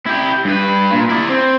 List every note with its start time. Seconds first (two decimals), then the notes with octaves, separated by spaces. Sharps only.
0.06 E4 G4
0.45 G2 B4
0.92 A#2
1.09 E4 D5
1.29 C4